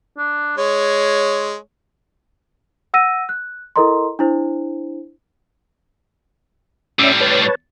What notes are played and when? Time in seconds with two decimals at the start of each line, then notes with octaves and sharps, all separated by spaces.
0.18 D4
0.57 G#3 C#5
2.94 F#5 E6 A#6 D#7
3.29 F#6
3.76 E4 A4 A#4 D#5 A#5 C6
4.19 D4 E4 C5
6.99 A2 G3 C#4 D5 E5
7.21 B4 C#5 A5